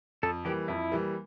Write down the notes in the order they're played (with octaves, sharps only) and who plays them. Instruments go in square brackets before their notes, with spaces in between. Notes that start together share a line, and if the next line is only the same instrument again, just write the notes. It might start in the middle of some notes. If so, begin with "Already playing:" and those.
[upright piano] F2 [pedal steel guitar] A4
[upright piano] E3 G3 A#3 [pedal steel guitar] G4
[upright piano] F2 [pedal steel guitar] E4
[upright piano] E3 G3 A#3